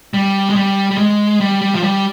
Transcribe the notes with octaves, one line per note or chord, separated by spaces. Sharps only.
G3
G#3
G3
G3
G#3
G3
G3
F3
G3